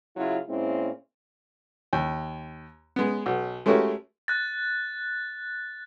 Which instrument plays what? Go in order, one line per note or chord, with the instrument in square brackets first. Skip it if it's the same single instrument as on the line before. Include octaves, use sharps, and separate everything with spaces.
[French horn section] C#3 F#3 E4 F4
A#2 G#3 C4 C#4 E4
[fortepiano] D#2
G#3 B3
B1
G#3 A3 C#4 F#4 G4 A#4
[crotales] F#6 A6